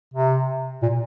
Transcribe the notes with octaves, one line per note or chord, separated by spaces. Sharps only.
C3
A#2